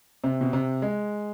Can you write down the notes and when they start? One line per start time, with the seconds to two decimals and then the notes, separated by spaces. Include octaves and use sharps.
0.24 C3
0.41 B2
0.53 C3
0.82 G#3